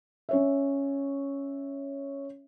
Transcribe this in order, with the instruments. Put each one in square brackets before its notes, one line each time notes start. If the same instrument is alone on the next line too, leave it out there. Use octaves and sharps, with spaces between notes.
[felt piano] C#4 C#5 E5